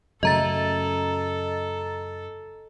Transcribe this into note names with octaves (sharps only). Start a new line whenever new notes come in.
F#2 C#3 A3 A4 D#5 A#5 A6